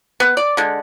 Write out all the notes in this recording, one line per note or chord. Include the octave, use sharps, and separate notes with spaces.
B3
D5
D3 G#3